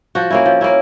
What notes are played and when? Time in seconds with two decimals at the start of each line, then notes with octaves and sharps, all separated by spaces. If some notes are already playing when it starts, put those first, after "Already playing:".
0.15 F3 F#4
0.30 A#3 C#4 E4
0.45 F3
0.61 A#3 C#4 E4